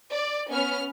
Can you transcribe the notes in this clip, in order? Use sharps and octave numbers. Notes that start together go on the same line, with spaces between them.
D5
B3 C#4 F6